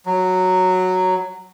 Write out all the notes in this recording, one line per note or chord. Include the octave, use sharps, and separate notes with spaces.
F#3